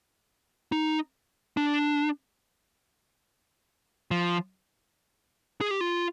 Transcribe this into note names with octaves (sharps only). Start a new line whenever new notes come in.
D#4
D4
F3
G#4
G4
F4